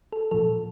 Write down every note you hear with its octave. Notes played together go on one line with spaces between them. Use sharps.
A4
A#2 F3 A4